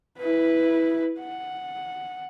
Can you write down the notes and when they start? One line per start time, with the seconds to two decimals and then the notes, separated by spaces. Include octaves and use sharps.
0.19 E4 B4
1.20 F#5